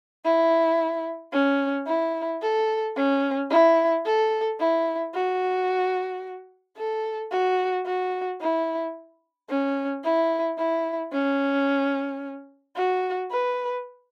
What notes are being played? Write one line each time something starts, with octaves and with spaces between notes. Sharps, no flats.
E4
C#4
E4
A4
C#4
E4
A4
E4
F#4
A4
F#4
F#4
E4
C#4
E4
E4
C#4
F#4
B4